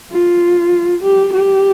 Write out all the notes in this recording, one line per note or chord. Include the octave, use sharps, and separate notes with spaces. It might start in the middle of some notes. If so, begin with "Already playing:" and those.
F4
G4
G4